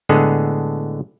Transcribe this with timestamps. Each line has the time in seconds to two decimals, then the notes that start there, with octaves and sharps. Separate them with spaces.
0.09 A2 D3 G#3 B3 G#4 A4